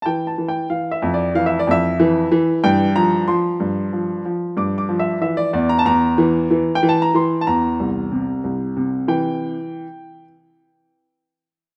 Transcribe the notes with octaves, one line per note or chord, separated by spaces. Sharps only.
A5
E3 G5
A5
E3
G5
E3 F5
E5
F2
D5
E3 F5
E5
D5
F2 E5
E3
E3
G2 G5
F3 A#5
F3 C6
G2
F3
F3
G2 D6
D6
F3
E5
E3 E5
D5
E2 D5
A#5
A5
E2 A#5
E3
E3
G5
E3
A5
A#5
E3 C6
A5
E2 A#5
C2
C3
C2
C3
E3 G5